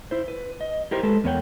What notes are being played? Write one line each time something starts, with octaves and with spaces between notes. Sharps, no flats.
E4 C5
B4
D#5
E4 G4 A#4 C5
G#3 A4 B4
E2 B3 A#4 C#5 F#5 G5